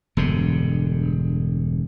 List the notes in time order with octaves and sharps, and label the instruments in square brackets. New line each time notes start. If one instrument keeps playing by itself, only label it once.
[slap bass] E1 G2 D3